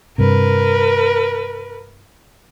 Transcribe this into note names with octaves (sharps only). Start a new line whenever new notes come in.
G2 C3 A#4 B4